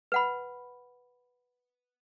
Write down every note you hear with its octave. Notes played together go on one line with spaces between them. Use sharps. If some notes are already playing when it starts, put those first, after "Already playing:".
B4 F#5 B5